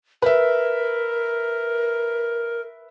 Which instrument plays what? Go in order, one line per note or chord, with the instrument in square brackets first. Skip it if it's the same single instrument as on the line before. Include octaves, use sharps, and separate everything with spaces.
[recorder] A#4 [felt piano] B4 E5